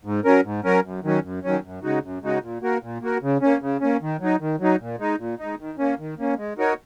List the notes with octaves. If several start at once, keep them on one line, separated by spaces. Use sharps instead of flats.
G#2
F#3 C#4 A#4
G#2
F#3 C#4 A#4
F#2
D#3 F#3 C#4
F#2
D#3 F#3 C#4
F#2
C#3 G#3 D#4 F#4
F#2
C#3 G#3 D#4 F#4
A#2
A#3 F#4 A#4
A#2
A#3 F#4 A#4
C#3
A#3 C#4
C#3
A#3 C#4
D#3
F#3 D#4
D#3
F#3 D#4
A#2
G#3 D#4
A#2
G#3 D#4
D#3
A#3 C#4
D#3
A#3 C#4
G#3
D#4 F#4 A#4 C#5